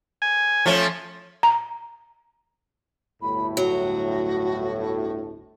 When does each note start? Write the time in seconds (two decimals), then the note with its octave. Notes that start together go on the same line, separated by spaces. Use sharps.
0.22 G#5
0.66 F3 A3 C#4
1.43 A#5
3.21 G1 D2 A2 B5
3.57 F#3 F#4